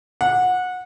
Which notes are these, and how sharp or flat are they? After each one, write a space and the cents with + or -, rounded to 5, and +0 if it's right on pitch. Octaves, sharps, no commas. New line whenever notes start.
F#5 -20